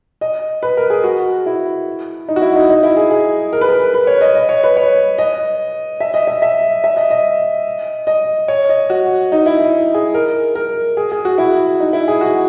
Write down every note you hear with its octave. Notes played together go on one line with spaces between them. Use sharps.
D#5
B4
A#4
G#4
F#4
E4
D#4
F#4
E4
D#4
D#4
E4
G#4
G#4
A#4
B4
A#4
B4
C#5
D#5
D#5
C#5
B4
C#5
D#5
E5
D#5
E5
E5
E5
D#5
D#5
D#5
C#5
D#5
F#4
D#4
E4
E4
G#4
A#4
A#4
G#4
G#4
F#4
E4
D#4
E4
G#4
F#4